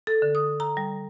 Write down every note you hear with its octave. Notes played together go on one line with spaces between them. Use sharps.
A4
D3
D#6
A#5
G3